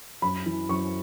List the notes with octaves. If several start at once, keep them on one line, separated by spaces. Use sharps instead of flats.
F#2 B5
E3
F#2 C#6